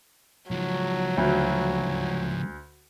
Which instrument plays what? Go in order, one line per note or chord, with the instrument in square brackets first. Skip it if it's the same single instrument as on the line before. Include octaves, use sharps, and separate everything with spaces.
[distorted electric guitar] C#2 F3 [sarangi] F#3
[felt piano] D2